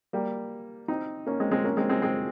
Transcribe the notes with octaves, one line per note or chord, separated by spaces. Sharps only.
G3 A#3
C4 D#4
A#3 C#4
G#3 C4
G#3 C4
A#3 C#4
G#3 C4
G#3 C4
G#3 C4